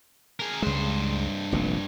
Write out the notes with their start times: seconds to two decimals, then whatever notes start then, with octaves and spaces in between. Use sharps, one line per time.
0.40 G#4 A#4
0.62 C#2 G2 G#3 C5
1.52 F1 A#1 A#2